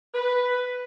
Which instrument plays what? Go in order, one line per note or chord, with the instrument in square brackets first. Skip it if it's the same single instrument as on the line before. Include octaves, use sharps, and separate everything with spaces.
[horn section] B4